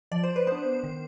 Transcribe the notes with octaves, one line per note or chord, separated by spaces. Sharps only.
F3 D5
C5
B4
B3 D4 C5
D#3